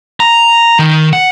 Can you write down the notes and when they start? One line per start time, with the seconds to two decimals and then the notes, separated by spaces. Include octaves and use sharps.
0.20 A#5
0.79 D#3
1.13 F#5